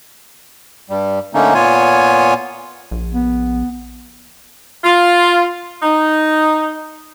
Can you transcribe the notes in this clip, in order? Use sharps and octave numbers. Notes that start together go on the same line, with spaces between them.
G2 G3
D3 A3 A#3 C#4 D#4
A#2 B3 F4 C#5 G#5
A#1
B3
F4
D#4